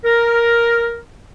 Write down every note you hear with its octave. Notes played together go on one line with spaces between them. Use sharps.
A#4